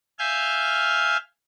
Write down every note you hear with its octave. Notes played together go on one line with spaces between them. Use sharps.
E5 F5 G#5 F6 G6